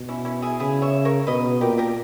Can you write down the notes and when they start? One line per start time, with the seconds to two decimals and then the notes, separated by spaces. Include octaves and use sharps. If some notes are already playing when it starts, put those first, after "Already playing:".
Already playing: B2
0.09 C#4 E4
0.25 C#4 E4
0.42 E4 G#4
0.60 C#3 E4 G#4
0.82 C#5 E5
1.05 A#4 C#5
1.27 B2 B4 D#5
1.61 A#2 G4 A#4
1.78 G4 A#4